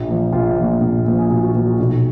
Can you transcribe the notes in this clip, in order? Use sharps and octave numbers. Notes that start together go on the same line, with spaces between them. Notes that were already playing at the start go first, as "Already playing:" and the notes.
Already playing: A#1 F4
A#2 F3
A#1 F4
A#2 F3
A#1
A#2 F3
G#4
A#1 F#4
F#4
A#2 F3 F#4
F#4
B1 F#4